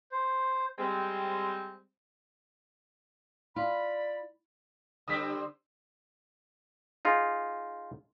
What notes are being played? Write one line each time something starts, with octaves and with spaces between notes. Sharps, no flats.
C5
G3 G#3 C4
F4 D5 B5
D3 G3 C4 D#6 E6 B6
D#4 F4 G#4